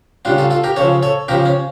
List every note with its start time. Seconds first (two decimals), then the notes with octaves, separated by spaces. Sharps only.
0.25 C#3 G3 D4 F4
0.38 F4 A4
0.51 F4 A4
0.64 G4 A#4
0.76 C#3 F3 A4 C#5
1.03 A4 C#5
1.28 C#3 F3 G4 A#4
1.45 C#4